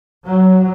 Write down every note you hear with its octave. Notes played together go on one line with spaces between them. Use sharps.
F#3